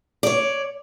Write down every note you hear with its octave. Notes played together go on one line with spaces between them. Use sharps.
C#5 D5